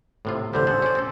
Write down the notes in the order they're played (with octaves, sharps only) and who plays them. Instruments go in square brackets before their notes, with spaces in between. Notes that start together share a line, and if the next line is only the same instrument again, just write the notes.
[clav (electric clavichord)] A2 C3 F4
[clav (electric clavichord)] A1 D3 G3 [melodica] C5
[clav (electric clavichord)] G#4 A4 F#5
C#4 D5
C4 A4